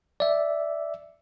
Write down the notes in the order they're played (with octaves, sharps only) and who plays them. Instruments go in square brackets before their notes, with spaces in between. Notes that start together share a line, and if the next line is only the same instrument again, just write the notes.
[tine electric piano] D5 E5